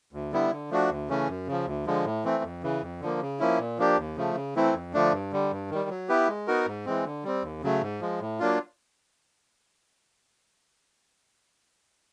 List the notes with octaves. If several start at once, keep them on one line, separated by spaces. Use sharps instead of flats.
D2
D3 G3 B3 E4
D3
F3 A3 D4 F#4
D2
C#3 E3 A3 C#4
F#2
C#3 F3
D2
D3 F3 G#3
A2
E3 A3 C4
F2
C#3 E3
F2
D3 F3 A#3
C#3
F3 A#3 C#4 E4
A#2
F3 A#3 D4 G4
D#2
C#3 F3 A3
C#3
E3 A3 C4 E4
F2
D3 F3 A3 D4
G2
D3 G3
G2
D#3 G3
F#3
B3 E4 G4 B4
G#3
B3 D#4 F#4 A#4
G#2
E3 G#3 C4
D3
G3 C4
D#2
C#3 F#3 A3
G#2
F3 G#3
A2
F#3 A#3 D4 F4